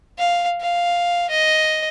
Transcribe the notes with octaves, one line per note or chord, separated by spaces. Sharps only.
F5
F5
D#5